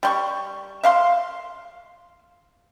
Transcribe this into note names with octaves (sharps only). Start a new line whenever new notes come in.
G3 C6 C#6
E5 F5 C6